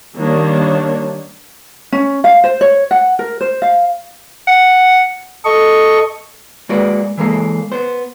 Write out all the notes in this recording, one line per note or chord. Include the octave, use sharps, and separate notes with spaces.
D#3 G3 A#3 D4 C#5
C#4
F5
C5
C#5
F#5
A#4
C5
F5
F#5
A4 D#5 C#6
G#3 A#3 F#4 B4 D5
E3 G#3 A#3 A4
B3 C5